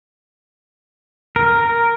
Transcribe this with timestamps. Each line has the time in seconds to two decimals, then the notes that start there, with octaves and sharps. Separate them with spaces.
1.36 A#4